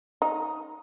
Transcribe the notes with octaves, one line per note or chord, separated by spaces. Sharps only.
D#4